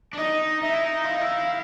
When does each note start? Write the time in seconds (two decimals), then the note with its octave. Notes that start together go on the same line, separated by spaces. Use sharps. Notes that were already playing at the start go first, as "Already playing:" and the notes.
0.13 D4
0.17 D#4 D#5
0.62 D#4 E5
0.73 E4
0.84 D#4
1.04 E4 F5
1.14 D#4
1.21 E4